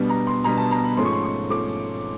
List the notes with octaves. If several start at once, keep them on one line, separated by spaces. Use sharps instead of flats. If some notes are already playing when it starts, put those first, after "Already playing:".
Already playing: B2 G3 B3 D4
A#5
C6
B2 G3 B3 D4 A#5
A5
A#5
B5
G#2 F3 A3 C#4 C6
C#6
C6
C#6
F3 A3 C#4 D6